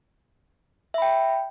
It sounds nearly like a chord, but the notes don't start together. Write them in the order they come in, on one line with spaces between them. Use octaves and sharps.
E5 B5 G5